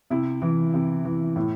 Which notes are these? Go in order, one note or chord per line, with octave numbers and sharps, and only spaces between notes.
C3 E4
E3
C3
E3
A2 E4